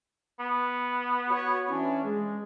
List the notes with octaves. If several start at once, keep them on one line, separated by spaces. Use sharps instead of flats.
B3
F#4 C#5
E3 C#4 D4
G#3